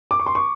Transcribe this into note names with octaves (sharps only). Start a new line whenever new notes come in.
D6
C#6
C6
C#6